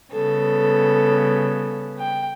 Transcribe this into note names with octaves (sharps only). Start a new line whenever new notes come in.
C#3 G3 B3 A4
G5